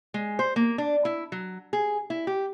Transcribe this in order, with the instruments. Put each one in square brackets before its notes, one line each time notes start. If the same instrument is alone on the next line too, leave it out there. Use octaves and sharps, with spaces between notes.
[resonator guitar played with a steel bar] G#3
C5
A#3
D4
E4
F#3
G#4
E4
G4